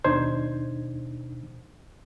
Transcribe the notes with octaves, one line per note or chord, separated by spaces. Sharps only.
D#2 B2 D4 D#4 C5 G#6